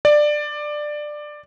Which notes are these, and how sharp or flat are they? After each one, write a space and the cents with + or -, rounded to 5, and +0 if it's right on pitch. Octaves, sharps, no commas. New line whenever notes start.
D5 +15